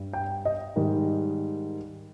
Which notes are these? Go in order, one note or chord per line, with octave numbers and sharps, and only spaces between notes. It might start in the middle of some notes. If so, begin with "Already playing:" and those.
Already playing: G2 G3
G5
D#5
G#2 D#3 G3